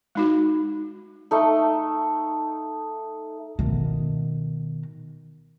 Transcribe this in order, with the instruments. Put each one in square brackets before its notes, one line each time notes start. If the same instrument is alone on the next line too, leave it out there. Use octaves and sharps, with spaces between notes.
[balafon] G#3 D#4 F#4
[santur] A3 D#4
[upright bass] B2 D#3